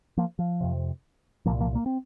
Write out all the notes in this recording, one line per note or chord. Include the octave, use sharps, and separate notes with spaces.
F3 A#3
F3
F2 C3
C2 A#2 F3 A#3
F3 A#3
A#3
C4